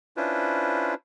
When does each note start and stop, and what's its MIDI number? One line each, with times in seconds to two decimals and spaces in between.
0.17 0.94 61
0.17 0.94 62
0.17 0.94 64
0.17 0.94 65
0.17 0.94 71
0.17 0.94 72